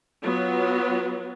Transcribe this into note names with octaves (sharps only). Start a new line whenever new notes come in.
F#3 B3 F4